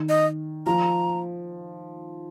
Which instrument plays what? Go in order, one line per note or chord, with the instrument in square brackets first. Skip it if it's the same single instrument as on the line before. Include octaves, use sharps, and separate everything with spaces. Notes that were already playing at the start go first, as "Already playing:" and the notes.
Already playing: [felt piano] D#3
[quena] D#5
[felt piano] F3 [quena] A#5